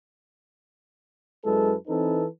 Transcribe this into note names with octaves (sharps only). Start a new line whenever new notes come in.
F#2 G#3 E4 A4 B4
E3 C4 D#4 A4 B4